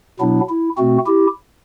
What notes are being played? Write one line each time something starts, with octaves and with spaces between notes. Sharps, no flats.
B2 F#3 B3 D4 E4
E4
B2 A3 C4 F#4
E4 G4